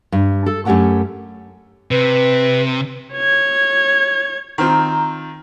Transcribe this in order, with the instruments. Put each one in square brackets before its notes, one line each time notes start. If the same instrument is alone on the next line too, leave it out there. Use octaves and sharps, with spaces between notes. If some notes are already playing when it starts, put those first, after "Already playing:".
[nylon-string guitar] G2
A4
F#2 A3 C#4 G4 F#5 A5
[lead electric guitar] C3 [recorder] B4
[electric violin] C#5 G#6
[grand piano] D#3 C4 F4 [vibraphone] A#5